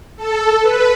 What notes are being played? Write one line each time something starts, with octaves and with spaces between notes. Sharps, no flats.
A4
B4